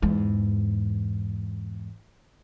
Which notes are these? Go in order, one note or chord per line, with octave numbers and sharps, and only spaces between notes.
E2 G#2